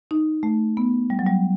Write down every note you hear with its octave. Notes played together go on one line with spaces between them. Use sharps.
D#4
A3
B3
G3
F#3
G3